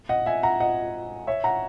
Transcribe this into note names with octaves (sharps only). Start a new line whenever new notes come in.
D#5 F#5
E5 G#5
F#5 A#5
D#5 F#5
C#5 E5
F#5 A#5